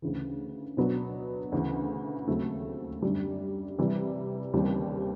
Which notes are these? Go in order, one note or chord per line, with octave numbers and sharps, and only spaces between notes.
D2 C#3 E3
B2 F#3 B3 D4
D2 C#3 E3
D#2 C#3 F#3 A3 C4
F#2 D3 G3
C3 E3 G3
D#2 C#3 E3 G3 C4